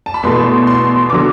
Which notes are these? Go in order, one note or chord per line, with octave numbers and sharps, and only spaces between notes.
A5
B5
E2 B2 A3 C6
C6
D3 F#3 D6